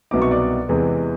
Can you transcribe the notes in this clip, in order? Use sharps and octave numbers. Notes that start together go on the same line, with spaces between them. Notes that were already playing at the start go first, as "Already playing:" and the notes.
C2 B2 F#3 B3 D#4 D6
C#6
D5 D6
E2 C3 E3 G#3